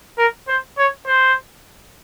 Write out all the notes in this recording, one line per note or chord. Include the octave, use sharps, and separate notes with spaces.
A#4
C5
C#5
C5